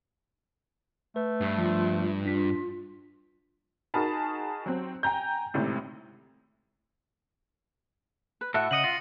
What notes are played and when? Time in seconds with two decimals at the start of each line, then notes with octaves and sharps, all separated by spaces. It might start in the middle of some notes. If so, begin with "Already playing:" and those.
1.16 A3 B4
1.41 G2
1.58 F3 F4
2.26 D4 F4 B6
3.94 D#4 F#4 G#4 A#4 A5 B5
4.66 F#3 C4
5.03 G5 G#5 A#5 G6
5.54 G#1 A2 C3
8.41 B4
8.54 A2 F#4 A4 E5 F#5
8.71 C#3 D#5 C#7 D#7 F#7
8.84 F4 A#6